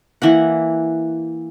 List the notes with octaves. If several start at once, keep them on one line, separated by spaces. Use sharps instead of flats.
E3 A#3 F#5